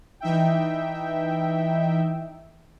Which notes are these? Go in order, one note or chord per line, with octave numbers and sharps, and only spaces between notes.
E3 D#4 E5 G5